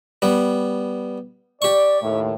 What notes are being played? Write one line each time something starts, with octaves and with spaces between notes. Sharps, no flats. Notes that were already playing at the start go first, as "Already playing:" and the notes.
G3 B3
G4 D5 C#6
D#2 A2